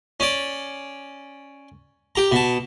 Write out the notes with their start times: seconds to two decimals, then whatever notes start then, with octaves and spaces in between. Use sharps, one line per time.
0.20 C#4 D5
2.15 G4 A#5
2.32 B2 A5